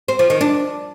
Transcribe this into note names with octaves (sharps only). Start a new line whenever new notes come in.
C4
F3
D#3
D4